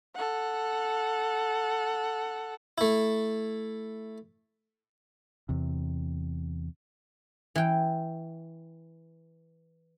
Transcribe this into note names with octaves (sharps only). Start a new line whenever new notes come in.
A4 F#5
A3 E4
E2 C3
E3 G5